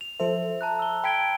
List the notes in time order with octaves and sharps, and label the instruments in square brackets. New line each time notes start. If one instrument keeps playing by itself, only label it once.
[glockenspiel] F7
[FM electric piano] F3 A4 C5 [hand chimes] E5
[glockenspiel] A5 A#5 F#6
E6 G7
[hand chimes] G5 B6 D7 [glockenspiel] B5 G#6 G7